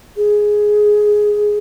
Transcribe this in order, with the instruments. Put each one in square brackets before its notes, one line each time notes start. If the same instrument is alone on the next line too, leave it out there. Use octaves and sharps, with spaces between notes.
[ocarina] G#4